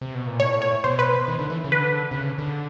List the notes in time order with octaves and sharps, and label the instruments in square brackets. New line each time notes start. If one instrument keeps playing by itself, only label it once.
[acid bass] C3
B2
A#2
[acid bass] A2 [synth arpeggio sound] C#5
[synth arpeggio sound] C#5
[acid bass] B2 [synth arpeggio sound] C5
[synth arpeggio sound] B4
[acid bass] D#3
D3
E3
C#3
[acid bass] D3 [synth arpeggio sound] B4
[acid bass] C3
C#3
D3